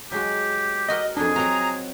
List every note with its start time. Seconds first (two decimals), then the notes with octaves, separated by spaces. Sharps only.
0.12 F#3 G#3 F#4 G4
0.88 D#4 F#4 A#4 D#5
1.17 F2 D4 D#4 G#4
1.36 F#3 C4 F#4 A#5